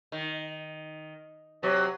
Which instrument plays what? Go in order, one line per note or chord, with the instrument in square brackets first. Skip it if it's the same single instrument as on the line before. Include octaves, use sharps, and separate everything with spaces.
[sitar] D#3
[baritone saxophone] C3 [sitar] F#3